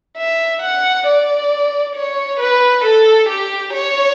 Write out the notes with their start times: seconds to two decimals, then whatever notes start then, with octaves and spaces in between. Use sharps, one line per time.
0.18 E5
0.62 F#5
1.07 D5
1.96 C#5
2.40 B4
2.84 A4
3.29 G4
3.74 C#5